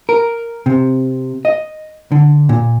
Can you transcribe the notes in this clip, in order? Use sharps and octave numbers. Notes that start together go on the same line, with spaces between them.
A#4
C3
D#5
D3
A#2